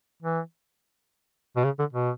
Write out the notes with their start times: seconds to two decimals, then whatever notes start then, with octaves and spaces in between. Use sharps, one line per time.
0.23 E3
1.56 B2
1.65 C#3
1.79 D3
1.93 B2